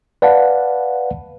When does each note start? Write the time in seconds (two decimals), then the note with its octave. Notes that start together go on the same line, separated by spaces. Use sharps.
0.22 B4 D5 F5 F#5 A5